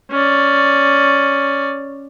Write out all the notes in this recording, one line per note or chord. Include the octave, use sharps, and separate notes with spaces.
C#4 D5